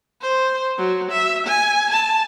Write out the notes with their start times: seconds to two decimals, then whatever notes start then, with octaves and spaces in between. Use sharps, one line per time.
0.21 C5
0.78 F#3
1.12 E5
1.47 G#5
1.91 A5